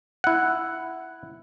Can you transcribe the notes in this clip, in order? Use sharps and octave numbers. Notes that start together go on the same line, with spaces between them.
E4 F#5